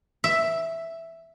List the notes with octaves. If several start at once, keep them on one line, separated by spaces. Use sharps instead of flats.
E5